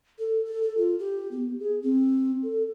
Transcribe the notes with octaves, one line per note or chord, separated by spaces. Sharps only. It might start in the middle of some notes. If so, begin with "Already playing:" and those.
A4
A4
A4
F4
G4
B3
G#4
C4
A4